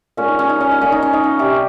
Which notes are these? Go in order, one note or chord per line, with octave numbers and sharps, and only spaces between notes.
A#2 G#3 C#4
D#4
C#4
D#4
C#4
D#4
A#2 G#3 C#4
D#4
C#4
D#4
C#4
C3 G3 G4